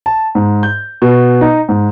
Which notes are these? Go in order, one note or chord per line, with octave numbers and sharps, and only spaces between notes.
A5
G#2
G6
B2
D#4
G#2